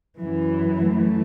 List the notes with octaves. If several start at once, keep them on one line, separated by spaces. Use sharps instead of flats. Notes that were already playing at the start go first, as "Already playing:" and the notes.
F#2 E3
A3